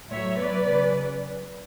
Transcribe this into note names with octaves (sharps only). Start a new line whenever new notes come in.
A2 F#3 C#5 E5
B2 F#3 B4 D5
C#3 F#3